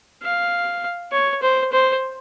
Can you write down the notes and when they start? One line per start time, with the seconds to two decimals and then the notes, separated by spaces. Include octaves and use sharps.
0.23 F5
1.12 C#5
1.42 C5
1.72 C5